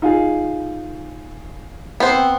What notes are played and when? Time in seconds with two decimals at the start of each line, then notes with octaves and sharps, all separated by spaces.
0.02 D#4 F4 G#4
2.00 B3 C4 C5